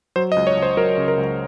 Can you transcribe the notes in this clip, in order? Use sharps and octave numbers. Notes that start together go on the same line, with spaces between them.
F#3 C5
D#5
C#2
C#5
C#2
C5
F#3 A#4
C#3
A#4
C#2